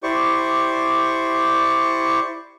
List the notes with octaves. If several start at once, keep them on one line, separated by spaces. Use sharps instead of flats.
E4 G4 C5 D5 C#6